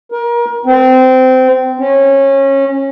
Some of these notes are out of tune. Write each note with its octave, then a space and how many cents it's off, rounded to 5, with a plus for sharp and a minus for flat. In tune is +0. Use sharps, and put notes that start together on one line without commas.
A#4 +30
C4 -20
C#4 -20